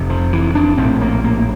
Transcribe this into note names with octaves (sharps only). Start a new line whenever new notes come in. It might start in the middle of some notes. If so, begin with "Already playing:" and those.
Already playing: F1 F2 C3
F3
E3
D4
A#1 A2 C4
A#3
A#3